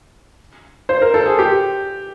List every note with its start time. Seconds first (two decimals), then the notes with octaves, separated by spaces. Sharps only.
0.89 C5
1.02 A#4
1.14 A4
1.26 G#4
1.39 G4